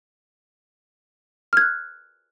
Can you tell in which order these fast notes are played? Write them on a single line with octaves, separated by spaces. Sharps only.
F6 G#6 F#6